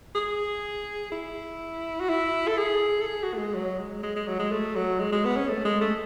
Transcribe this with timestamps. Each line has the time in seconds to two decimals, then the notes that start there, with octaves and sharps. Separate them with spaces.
0.15 G#4
1.12 E4
2.00 F#4
2.09 E4
2.48 A4
2.58 G#4
3.02 A4
3.07 G#4
3.23 F#4
3.34 A3
3.38 G#3
3.54 F#3
3.79 G#3
4.03 G#3
4.16 G#3
4.28 F#3
4.39 G#3
4.52 A3
4.76 F#3
5.00 G#3
5.12 G#3
5.25 B3
5.36 C#4
5.49 A3
5.65 G#3
5.81 A3